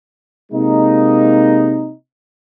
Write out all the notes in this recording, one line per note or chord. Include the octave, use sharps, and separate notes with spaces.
C3 G#3 A#3 D#4